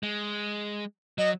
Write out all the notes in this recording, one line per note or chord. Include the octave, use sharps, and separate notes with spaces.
G#3
F#3 D#5